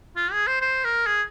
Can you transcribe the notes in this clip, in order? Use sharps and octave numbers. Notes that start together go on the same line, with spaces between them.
F4
G#4
C5
C5
A#4
G#4